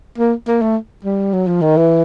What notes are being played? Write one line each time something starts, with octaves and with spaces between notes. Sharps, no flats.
A#3
A#3
A3
G3
F#3
F3
D#3
E3